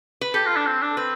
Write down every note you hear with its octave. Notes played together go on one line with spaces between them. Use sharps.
B4
G4 A4
F4
D4
C4
D4
C4 B4